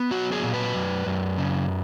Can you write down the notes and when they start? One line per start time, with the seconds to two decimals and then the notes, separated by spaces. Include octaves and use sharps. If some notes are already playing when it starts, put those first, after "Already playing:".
Already playing: B3
0.11 F#3 F#4
0.32 G#4
0.43 A#2
0.54 B4
0.75 F#2
1.06 F#2
1.38 C#3